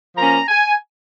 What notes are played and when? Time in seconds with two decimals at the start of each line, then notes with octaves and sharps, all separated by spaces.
0.17 F3 A#3 C#4 A#5
0.48 G#5